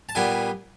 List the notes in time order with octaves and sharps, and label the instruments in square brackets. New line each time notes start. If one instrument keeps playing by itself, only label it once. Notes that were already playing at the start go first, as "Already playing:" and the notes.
[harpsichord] A5
A#2 G3 B3 G#5